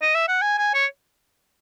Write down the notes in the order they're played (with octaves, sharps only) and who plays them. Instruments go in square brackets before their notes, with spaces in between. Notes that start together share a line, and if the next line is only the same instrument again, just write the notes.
[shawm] D#5
E5
F#5
G#5
G#5
C#5